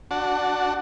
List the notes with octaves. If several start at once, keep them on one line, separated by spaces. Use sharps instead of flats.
D4 F#4 F#5 A5